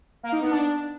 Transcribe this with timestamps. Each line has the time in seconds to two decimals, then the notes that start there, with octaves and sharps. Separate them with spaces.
0.23 A#3
0.32 D#4
0.41 B3
0.50 D4